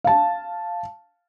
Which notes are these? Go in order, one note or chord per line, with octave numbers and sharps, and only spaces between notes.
F5 A5